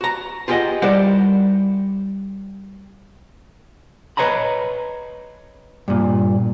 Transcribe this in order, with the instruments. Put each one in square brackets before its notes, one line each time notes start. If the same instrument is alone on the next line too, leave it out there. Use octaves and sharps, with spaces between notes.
[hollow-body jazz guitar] F#4 A#5
F4 G4 G#4 B4 D#5 F#5
G3 E4 A#4 C5 D5 F#5
B4 C#5 D#5 A#5 B5
G2 A#2